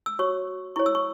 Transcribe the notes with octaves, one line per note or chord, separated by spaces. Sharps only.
E6
F#4 C#5 C#6
E4 C#5 C#6
E6
C#6